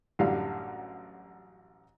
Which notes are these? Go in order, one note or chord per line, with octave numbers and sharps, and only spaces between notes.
A1 F#2 D3 G3 F5